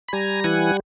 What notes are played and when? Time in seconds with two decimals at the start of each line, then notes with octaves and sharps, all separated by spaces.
0.08 B5
0.13 G3 G#5 A#5
0.44 E3 F#5 G#5